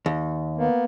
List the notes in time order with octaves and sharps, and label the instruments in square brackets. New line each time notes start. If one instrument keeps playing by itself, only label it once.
[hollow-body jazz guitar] D#2
[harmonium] A#3 B3